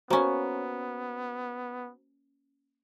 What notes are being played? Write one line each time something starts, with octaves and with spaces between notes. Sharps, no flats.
A#3 B3 C#4 F#4 C5 A#5